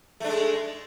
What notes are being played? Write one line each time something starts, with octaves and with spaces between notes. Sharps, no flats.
G#3 A3 D4